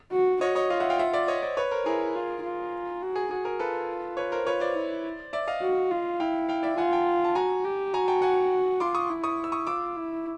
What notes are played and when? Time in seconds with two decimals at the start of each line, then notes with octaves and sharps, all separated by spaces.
0.12 F#4
0.41 F#4 C#5 D#5
0.55 C#5 D#5
0.70 F4 D#5 F5
0.80 E5 F#5
0.90 F5 G5
0.99 E5 F#5
1.13 D5 E5
1.28 C#5 D#5
1.42 C5 D5
1.57 B4 C#5
1.71 A#4 C5
1.85 E4 G#4 A#4
2.15 F4
2.43 F4
3.02 F#4
3.16 G#4
3.31 F#4 G#4
3.45 G#4 A#4
3.59 F4 A4 B4
4.17 B4 C#5
4.32 A#4 C5
4.46 F4 B4 C#5
4.60 C5 D5
4.75 E4
5.33 D5 E5
5.47 D#5 F5
5.61 F#4
5.91 F4
6.20 E4 F5 G5
6.49 F5 G5
6.63 D5 E5
6.77 F4 F#5 G#5
6.92 G5 A5
7.24 A5
7.35 F#4 G#5 A#5
7.65 G4
7.93 F#4 G#5 A#5
8.08 G5 A5
8.22 F#5 G#5
8.80 F4 C6 D6
8.95 C#6 D#6
9.10 E4
9.23 C#6 D#6
9.44 E6
9.52 C#6 D#6
9.67 F4 D6 E6
9.96 E4